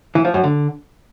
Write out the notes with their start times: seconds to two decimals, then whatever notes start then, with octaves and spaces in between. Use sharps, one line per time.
0.15 E3
0.25 F3
0.34 F#2
0.44 D3